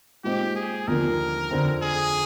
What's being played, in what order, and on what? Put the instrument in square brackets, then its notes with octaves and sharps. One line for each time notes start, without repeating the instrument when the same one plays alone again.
[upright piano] A#2 G#3 C4 D#4 [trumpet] G4
[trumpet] G#4
[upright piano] D#2 D3 F3 A#3 [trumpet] A#4
[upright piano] F2 D3 F3 C4
[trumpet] G#4